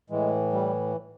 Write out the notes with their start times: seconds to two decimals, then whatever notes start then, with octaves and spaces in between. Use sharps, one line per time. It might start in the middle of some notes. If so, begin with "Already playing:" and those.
0.10 A2 E3 G#3
0.53 G3